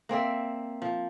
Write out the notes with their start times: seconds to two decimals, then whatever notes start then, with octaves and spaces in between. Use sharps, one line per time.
0.09 A#3 C4 D5 E5
0.82 F3